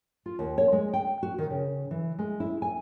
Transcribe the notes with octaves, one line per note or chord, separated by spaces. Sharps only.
F4
D#2
C#5
G#3
G5
F#4
D#3
C#3
E3
G#3
E4
G#5